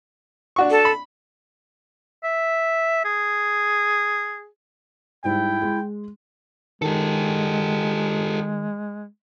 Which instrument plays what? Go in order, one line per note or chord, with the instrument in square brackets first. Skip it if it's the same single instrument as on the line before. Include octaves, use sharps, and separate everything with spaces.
[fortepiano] D4 F#4 C#6
[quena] A4
[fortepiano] B5
[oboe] E5
G#4
[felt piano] G#2 G3 [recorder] E4 [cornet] G5
[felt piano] G#3
[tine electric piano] D#3 [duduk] G#3 [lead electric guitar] G4 A4